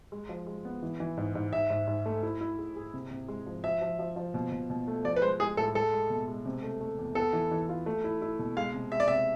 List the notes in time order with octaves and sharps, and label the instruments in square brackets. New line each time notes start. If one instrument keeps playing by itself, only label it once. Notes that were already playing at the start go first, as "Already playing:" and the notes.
[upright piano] G#3
F3
G#3
B3
E3
E3
G#2
G#2
[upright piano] G#2 [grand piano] E5
[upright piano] G#2
G#2
A3
E4
E4
G#4
G#4
C3
C3
G#3
F3
[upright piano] F3 [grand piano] E5
[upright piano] F3
F3
F3
B2
B2
B2
A3
[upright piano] F3 [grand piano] D5
[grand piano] B4
[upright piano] G#3 [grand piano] C5
[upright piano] G#3 [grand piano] G#4
[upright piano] A2 [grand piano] A4
[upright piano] G#3 [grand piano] A4
[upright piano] G#3
B2
G#3
C3
A3
A3
E2
[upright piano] B3 [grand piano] A4
[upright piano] E3
E3
F4
A3
E4
E4
B2
[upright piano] G#3 [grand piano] F5
[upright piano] C3
[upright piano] G#3 [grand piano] E5
[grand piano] D5
[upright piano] C3 [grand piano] E5